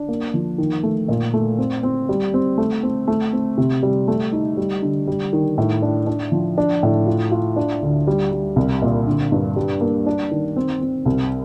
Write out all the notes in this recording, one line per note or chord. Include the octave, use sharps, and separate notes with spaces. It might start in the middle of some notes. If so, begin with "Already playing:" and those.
Already playing: D4
A#3
F3
D#3
A3
A#2
A3
C4
C4
G3
C4
A3
C4
A3
C4
C3
G3
A3
D#4
G3
D3
G3
D#3
A2
D4
D4
F3
D4
A2
F4
F4
D4
D2
G3
G3
C2
A#2
D3
G2
G3
A#3
D4
D#3
C4
C4
C2